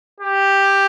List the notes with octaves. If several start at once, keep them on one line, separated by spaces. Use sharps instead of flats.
G4